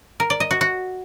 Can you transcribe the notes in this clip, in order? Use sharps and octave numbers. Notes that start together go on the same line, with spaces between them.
A#4
D5
D#5
F#4
F#4